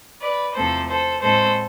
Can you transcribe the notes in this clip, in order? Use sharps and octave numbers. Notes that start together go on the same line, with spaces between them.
B4 D5
E2 C3 F3 A3 C4 A4 C5
A4 C5
A2 G#3 C4 A4 C5